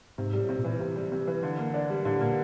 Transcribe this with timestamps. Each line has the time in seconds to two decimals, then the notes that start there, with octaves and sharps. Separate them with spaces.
0.18 G#2 C3
0.33 G3
0.39 A2
0.49 C3
0.59 A#2
0.64 E3
0.80 C3
0.96 G3
1.12 C3
1.27 E3
1.43 D3
1.59 A#3
1.74 D4
1.90 G3
2.05 A2 D3
2.20 A#2 A#3